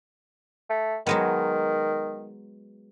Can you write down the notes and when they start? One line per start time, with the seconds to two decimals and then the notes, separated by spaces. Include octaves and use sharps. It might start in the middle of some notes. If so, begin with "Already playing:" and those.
0.70 A3
1.06 D#3 F#3 G#3 B3